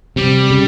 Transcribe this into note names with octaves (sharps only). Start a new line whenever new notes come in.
C3 G3
C#3